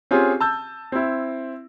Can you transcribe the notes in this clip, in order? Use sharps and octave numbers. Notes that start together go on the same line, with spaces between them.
C4 C#4 F4 G4 G#4
A5 E6 G6
C4 E4